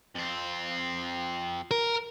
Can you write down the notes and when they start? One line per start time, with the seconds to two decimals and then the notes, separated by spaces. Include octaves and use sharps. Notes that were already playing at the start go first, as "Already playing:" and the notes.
0.15 F2 C4
1.71 A#4